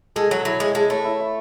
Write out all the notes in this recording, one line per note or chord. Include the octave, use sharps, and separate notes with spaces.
G#3 A4
F#3 C#5
F#3 E4
G#3 E5
G#3 A4
A3 C#5
E4
E5